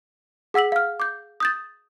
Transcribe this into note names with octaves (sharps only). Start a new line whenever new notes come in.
G#4 F#5 E6 B6 F#7
F5 F6
D6 G6
D#6 G6 A6